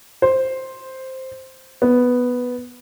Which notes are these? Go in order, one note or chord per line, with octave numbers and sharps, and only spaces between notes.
C5
B3